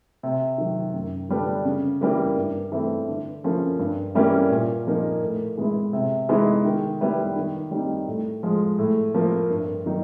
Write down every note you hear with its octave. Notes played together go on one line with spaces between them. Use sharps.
C3
D#3 F#3
F#2
D3 G3 B3 D4
C#3
E3 G3 A#3
G2
E3 A3 C4
D3
F3 A#3 C#4 E4
G2
E3 G3 A#3 C#4
A#2
F3 A#3 D#4
A2
E3 G#3 B3 E4
C3
E3 G#3 B3 D#4
D#3
G3 B3 E4
D#3
G3 C4 D#4
A2
F3 G#3
A2
F3 A#3
G2
D#3 F#3 A#3 D#4